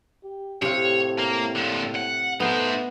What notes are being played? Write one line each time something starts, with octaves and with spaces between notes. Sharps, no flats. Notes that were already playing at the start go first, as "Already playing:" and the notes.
G4
A2 C3 C#5 F5
A#3
A#2 D3
F#5
A3 B3 D#4 C5